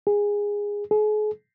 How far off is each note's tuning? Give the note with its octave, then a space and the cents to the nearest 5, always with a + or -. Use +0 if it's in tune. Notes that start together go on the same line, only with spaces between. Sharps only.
G#4 -15
G#4 +40